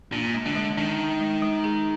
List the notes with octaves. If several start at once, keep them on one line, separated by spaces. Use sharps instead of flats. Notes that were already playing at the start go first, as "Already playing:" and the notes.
A#2 D4
G#3
D3
G#3
D#3 D4
G#3
G#3
G#3
G#4